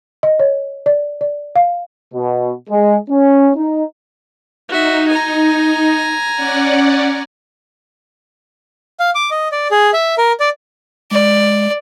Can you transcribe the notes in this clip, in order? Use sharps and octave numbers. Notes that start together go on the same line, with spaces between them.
D#5
C#5
D5
D5
F5
B2
G#3
C#4
D#4
D#4 F#4 E5
G#5 A#5
C#4 D5 F#5
F5
D6
D#5
D5
G#4
E5
A#4
D5
G#3 D5